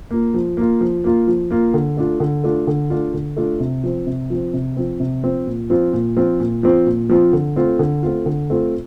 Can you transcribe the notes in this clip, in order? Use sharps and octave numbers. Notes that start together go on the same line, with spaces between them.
A#3 F4
F3
A#3 F4
F3
A#3 F4
F3
A#3 F4
D3
A3 D4 F4
D3
A3 D4 F4
D3
A3 D4 F4
D3
A3 D4 F4
C3
F3 C4
C3
F3 C4
C3
F3 C4
C3
F3 C4
A#2
F3 C4 F4
A#2
F3 C4 F4
A#2
F3 C4 F4
A#2
F3 C4 F4
D3
A3 C4 F4
D3
A3 C4 F4
D3
A3 C4 F4